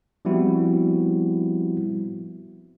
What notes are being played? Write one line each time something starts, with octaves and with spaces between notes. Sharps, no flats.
F3 G3 B3 C4 E4 F#4